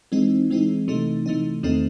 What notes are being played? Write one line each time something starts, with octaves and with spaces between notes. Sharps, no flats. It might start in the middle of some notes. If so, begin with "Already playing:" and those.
E3 G#3 C4 D#4
E3 G#3 C4 D#4
C3 E3 A3 D#4
C3 E3 A3 D#4
E2 D#3 A3 C4 D#4